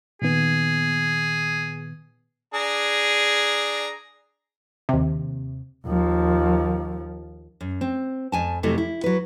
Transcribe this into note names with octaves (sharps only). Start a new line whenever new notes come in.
A#2 D#3 B3 G#4
D4 G#4 A#5
D#2 C3
D#2 F3
F#2
C4
F2 G#5 A5
F2 C3 F#3 A3 E4 A4
E4
F#3 B4